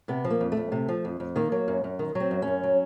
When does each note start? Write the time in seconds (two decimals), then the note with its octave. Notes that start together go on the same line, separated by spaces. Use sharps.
0.08 C3 B3
0.24 F3
0.30 A#3
0.41 F2
0.52 A3
0.57 F2
0.72 C3
0.88 F3
1.05 F2
1.20 F2
1.36 D#3 A#3
1.52 F#3
1.68 F#2
1.84 F#2
1.99 D#3
2.15 F#3
2.20 C4
2.31 F#2
2.42 F#2 C#4
2.63 F#3